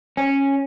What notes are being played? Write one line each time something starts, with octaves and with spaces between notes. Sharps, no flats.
C#4